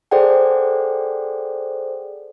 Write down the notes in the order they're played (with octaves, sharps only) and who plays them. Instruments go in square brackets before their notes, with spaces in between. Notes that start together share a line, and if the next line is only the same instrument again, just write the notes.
[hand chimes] G#4 A4 C5 D5 F#5 G5